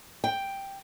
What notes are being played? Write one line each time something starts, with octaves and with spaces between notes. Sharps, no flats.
G5